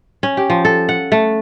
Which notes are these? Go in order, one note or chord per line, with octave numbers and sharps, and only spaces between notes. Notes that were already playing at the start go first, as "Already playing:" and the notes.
C#4
G4
F3
A4
F#5
A3